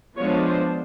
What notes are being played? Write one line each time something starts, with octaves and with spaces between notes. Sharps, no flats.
F3 G#3 B3 D4 C#5
C5